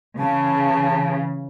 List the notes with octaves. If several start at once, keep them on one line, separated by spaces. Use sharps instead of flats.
C#3 E3 A5